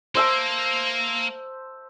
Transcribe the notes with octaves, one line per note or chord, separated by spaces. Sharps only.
A#3 C5 E5 A5